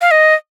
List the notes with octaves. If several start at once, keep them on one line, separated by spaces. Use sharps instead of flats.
F5
D#5